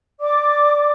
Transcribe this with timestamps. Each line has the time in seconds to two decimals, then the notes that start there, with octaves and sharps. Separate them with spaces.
0.20 D5 D6